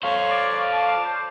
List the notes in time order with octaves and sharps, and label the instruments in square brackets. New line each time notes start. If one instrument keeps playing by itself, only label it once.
[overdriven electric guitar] A4 C5 [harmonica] C#5 [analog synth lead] F5
[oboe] D5
[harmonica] A5
[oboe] C5